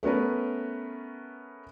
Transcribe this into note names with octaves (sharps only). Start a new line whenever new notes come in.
A3 B3 C#4 A#4 B4